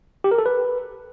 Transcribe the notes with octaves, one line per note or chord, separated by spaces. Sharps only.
G4
A#4
A4
B4